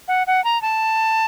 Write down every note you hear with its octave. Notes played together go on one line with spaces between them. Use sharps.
F#5
F#5
A#5
A5